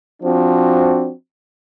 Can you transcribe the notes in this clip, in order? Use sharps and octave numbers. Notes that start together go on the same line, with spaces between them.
F3 C4 D4 F#4